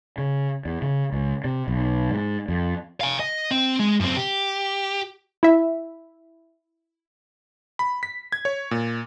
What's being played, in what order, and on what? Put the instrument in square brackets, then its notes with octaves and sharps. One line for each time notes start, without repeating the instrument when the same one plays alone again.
[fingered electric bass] C#3
E2
C#3
C#2
C3
B1
G#2
F2
[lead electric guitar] F5 G#5
D#5
C4
G#3
F#2 C4
G4
[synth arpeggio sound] E4 E5
[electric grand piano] B5
B6
G#6
C#5
A#2